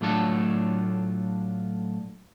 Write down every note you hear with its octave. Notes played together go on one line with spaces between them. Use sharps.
A2 F#3 A3 D4 F4 A4